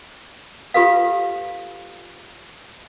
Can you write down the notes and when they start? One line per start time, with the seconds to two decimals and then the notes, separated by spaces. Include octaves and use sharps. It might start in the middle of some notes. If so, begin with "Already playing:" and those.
0.74 F4 G4 A4 B4 F5